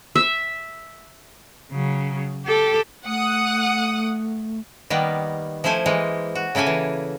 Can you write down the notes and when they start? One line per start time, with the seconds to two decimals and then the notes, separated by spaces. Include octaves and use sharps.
0.16 E5
1.72 C#3 F#3
2.46 G4 A4
3.06 A3 F#5 D#6
4.90 D#3 G3 A#3 B3
5.64 F3 A3 E4 C5 G#5
5.86 E3 G#3 A#3
6.35 F#4
6.55 C#3 A#3 E4 A4 G#5
6.67 E3